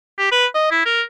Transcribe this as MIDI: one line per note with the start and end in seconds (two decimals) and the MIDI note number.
0.18 0.27 67
0.32 0.46 71
0.55 0.70 75
0.71 0.82 64
0.86 1.02 70